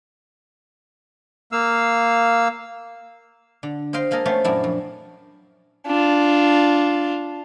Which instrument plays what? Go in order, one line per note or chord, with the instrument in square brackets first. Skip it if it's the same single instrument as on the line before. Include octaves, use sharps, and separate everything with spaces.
[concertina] A#3 F5 E6
[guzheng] D3
C5 D#5 F5 G5 C6
G#3 A#3 A4 A#4 D#5
A3 B3 C#4 G4 C5 F5
F#2 A#2 D4 E4
F2
[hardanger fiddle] D4 F4